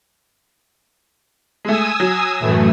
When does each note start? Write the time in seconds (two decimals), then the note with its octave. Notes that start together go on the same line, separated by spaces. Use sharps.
1.65 G#3 A3 G#5 D#6 E6
2.00 F#3
2.40 F#2 A2 E3 A3